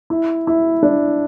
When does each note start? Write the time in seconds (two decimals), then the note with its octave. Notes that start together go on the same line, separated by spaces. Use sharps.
0.10 E4
0.47 E4
0.83 D4